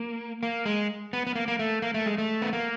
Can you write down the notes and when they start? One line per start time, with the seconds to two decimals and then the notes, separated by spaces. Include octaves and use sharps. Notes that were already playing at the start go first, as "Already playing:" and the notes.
Already playing: A#3
0.43 A#3
0.66 G#3
1.13 B3
1.27 B3
1.36 A#3
1.48 A#3
1.59 A3
1.82 A#3
1.94 A3
2.06 G#3
2.18 A3
2.42 B3
2.53 A#3